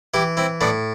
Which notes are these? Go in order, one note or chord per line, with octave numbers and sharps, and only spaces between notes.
E3 E4 G4
C4 E4
A2 B3 D4